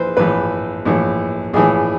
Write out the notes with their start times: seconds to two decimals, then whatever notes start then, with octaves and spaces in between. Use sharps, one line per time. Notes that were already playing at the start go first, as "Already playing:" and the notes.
Already playing: A#1 E3 B4 C5
0.17 A#1 A2 E3 B4
0.85 A#1 A2 E3
1.53 A#1 A2 E3 G#4